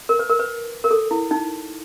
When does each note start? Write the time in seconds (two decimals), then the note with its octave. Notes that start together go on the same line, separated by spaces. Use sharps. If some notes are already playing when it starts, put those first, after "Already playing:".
0.09 A#4
0.19 B4
0.30 A#4
0.39 B4
0.84 A#4
0.91 A4
1.11 E4
1.31 D#4